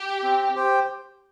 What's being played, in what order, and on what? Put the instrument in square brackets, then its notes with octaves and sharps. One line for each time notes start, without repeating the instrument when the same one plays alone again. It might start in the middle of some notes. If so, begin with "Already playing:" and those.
Already playing: [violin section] G4
[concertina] C4
G4 C5 G5